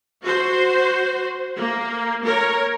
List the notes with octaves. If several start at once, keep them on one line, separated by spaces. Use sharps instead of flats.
F#4 C5
A#3
A#4 C#5